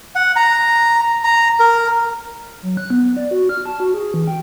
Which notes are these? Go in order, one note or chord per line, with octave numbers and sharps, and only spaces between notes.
F#5
A#5
A#5
A#4
F#3
F#6
B3
D5
F#4
F6
A5
F#4
G#4
E3
G5